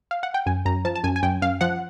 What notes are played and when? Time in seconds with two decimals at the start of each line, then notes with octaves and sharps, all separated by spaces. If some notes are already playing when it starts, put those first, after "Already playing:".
0.11 F5
0.23 F#5
0.34 G5
0.46 F#2 G#5
0.65 F#2 A#5
0.85 F3 A5
0.96 A5
1.04 F#2 G#5
1.16 G#5
1.23 F#2 G5
1.42 F#2 F5
1.61 F3 F#5